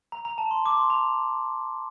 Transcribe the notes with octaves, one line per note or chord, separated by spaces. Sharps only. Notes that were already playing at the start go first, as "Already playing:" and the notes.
A#5
A#5
A5
C6
D6
C6
A#5